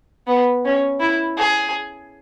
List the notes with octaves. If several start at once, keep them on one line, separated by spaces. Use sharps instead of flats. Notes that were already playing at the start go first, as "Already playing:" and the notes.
B3
C#4
E4
G#4